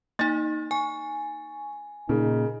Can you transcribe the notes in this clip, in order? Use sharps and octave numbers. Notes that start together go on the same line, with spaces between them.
A#3 D#4 A6
G#5 C#6
A#2 C#3 A#3 D#4